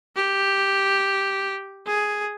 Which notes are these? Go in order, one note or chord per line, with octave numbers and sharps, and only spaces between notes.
G4
G#4